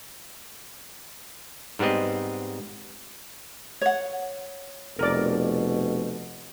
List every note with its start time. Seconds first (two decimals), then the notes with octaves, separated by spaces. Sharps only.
1.79 G#2 G3 B3 C4 D#5
3.81 C#5 F#5
4.99 F1 B2 A#4 D5